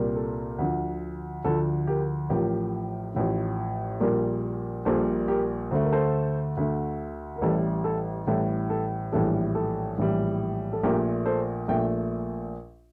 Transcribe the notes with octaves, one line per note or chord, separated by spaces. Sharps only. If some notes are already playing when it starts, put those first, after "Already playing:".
Already playing: C2 A#2 G3 A#3
A4
D2 D3 F3
D2 D3 F3 A4
G4 A#4
A1 A2 F3 G4 A#4
A1 A2 F3
A#1 A#2 G3 A#3
A#1 A#2 G3 A#3 A4 C5
G4 A#4
D2 D3 A3 C5
A#4
A4 C5
D2 D3 A3
A#4
A1 A2 E3 G3 A4
A4
A1 A2 E3 G3 A4
A4
A#1 A2 E3 G3 A4
A4
A#1 A2 E3 G3
A4
A#1 A#2 A3 G4 A#4
A4 C5
A#1 A#2 A3 E5 G5